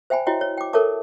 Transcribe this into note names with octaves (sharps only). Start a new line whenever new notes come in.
C5 E5 G5 G#5 B5
E4 F#4 C#5 D#5 G5
C#5
G5 D6
A4 A#4 C#5 E5 A5 D6